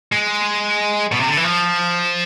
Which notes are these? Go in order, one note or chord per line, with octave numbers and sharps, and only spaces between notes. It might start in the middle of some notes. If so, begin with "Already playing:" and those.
G#3
B2
C3
D3
E3
F3